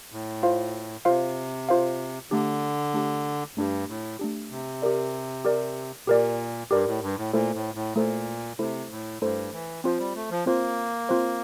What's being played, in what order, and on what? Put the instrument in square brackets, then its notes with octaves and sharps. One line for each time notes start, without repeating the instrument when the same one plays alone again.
[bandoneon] A2
[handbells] F4 C5 F5
[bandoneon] C3 [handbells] F4 C5 F5
[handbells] F4 C5 F5
[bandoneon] D3 [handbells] A3 D4 G4
[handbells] A3 D4 G4
[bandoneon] G2 [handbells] A3 D4 G4
[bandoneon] A2
[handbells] A3 D4 G4
[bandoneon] C3
[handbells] G4 A#4 D5
G4 A#4 D5
[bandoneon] A#2 [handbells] G4 A#4 D5
[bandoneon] G2 [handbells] G4 A#4 D5
[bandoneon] A2
G2
A2
[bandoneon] A#2 [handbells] A3 E4 A4 C5
[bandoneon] A2
A2
[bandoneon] A#2 [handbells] A3 E4 A4 C5
[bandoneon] C3 [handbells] A3 E4 A4 C5
[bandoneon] A2
[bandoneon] G2 [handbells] A3 E4 A4 C5
[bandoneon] E3
[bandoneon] F3 [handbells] C4 F4 C5
[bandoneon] G3
A3
F3
[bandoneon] A#3 [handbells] C4 F4 C5
[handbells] C4 F4 C5